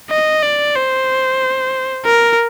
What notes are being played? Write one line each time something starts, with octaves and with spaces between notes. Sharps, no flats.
D#5
D5
C5
A#4